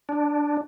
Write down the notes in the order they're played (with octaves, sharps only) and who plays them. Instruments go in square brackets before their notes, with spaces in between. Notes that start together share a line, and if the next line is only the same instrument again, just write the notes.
[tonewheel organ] D4